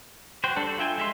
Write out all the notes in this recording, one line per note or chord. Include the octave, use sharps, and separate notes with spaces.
F#4 C5 G5
G3 D4 A4
F4 E5 G5 G#5
G#3 E5 C6